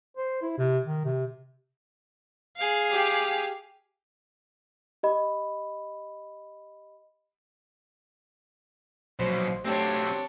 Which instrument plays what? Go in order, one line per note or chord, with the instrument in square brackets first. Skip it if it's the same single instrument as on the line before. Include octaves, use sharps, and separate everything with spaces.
[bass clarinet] C5
E4
C3
D#3
C3
[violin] G#4 F5
[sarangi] G4
[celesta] G4 D#5 B5
[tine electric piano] A#1 F#3 [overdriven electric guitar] D#2 B2 [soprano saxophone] C5
[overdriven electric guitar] F#3 C4 [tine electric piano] A3 [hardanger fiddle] D4 C#5 [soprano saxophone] G4